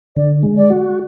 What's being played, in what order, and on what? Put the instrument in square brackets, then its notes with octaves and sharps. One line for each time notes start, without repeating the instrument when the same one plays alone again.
[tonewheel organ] D3 [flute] D5
[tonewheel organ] G#3
[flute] D5
[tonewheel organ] F#4